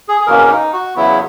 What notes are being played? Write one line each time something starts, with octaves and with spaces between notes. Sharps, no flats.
G#4
G#4
E2 B2 A#3 C#4 A#4
D#4
F#4
E2 C#3 F#3 B3 E4